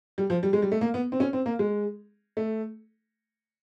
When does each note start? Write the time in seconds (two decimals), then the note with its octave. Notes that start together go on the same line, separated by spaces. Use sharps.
0.18 G3
0.30 F3
0.43 G3
0.53 G#3
0.62 G3
0.72 A3
0.81 A#3
0.94 B3
1.12 C4
1.20 C#4
1.33 C4
1.46 A#3
1.59 G#3
2.37 A3